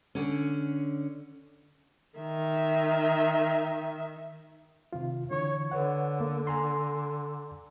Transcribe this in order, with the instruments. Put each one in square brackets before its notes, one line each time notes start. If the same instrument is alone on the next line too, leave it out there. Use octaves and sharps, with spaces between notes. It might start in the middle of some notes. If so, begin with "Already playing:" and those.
[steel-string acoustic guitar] D3 C#4
[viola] D#3 E5
[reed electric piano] C3 D#3 F4
[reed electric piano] D3 E3 C#6 [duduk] C#5
[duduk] D3 [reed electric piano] B4 C#5 F#5
[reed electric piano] A#3
G#5 A#5 C6